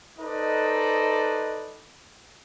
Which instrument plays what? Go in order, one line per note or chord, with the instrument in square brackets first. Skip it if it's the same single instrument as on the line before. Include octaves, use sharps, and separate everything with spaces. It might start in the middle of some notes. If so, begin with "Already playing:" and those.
[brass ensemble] D#4 A4 B4 C5 D5 D#5